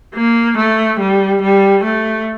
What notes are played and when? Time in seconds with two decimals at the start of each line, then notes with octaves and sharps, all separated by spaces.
0.15 A#3
0.57 A3
0.99 G3
1.42 G3
1.84 A3